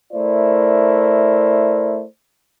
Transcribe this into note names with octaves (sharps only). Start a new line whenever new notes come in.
A3 E4 A#4 C5 D5